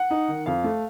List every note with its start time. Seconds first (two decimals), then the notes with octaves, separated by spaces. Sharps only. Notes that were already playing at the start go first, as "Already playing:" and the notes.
Already playing: F#5
0.10 D#4
0.28 D#3
0.46 F2 F5
0.64 A3